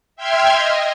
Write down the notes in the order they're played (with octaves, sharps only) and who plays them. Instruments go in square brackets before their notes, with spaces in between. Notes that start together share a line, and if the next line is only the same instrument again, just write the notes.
[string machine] E5 G5 C6 F6 G#6
D#5